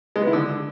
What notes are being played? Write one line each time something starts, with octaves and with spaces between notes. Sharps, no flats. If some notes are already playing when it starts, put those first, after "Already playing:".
G#3
B3
E4
D3